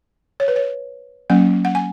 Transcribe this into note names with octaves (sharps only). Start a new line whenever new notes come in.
C#5
B4
C#5
F#3 A#3 C#4 F#5
F#5
G#5